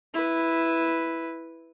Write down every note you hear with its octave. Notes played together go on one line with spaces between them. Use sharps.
E4 B4